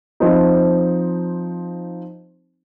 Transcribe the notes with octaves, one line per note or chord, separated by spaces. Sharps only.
F3 C4 D#4